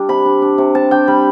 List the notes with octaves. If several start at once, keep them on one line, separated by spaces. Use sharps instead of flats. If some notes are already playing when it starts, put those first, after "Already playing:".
Already playing: G3 D4
C3 B5
D4
D4
C3
C3 A5
D4 G5
G3 B5